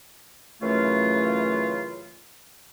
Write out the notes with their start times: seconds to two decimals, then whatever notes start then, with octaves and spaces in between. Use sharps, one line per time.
0.62 F#2 C#3 E3 A3 F4